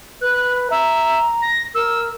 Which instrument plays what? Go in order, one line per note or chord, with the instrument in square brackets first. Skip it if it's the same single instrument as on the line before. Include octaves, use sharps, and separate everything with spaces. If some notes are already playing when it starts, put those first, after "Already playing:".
[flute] B4 [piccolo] F#6
[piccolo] E5 [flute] A#5
[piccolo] A#6
[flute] A#4 [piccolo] E6